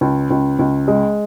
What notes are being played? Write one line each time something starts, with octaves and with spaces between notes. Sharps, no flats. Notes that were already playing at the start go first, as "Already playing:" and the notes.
C#2
C#2
C#2
G#3